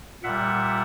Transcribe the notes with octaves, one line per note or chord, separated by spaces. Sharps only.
A#2 G3 E5 F#5